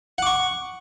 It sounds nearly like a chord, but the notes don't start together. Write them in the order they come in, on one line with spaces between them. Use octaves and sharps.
F#5 D6 C#6